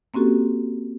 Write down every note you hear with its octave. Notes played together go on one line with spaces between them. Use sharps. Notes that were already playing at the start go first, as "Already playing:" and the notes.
A#3 C4 C#4 F#4 G4 A4